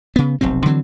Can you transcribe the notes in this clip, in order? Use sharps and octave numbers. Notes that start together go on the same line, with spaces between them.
C#3 B3
F1 B1 C3 C4
D3 E3 F#3 C4